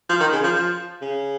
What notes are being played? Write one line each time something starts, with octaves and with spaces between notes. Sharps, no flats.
F3
D#3
C#3
F3
F3
C#3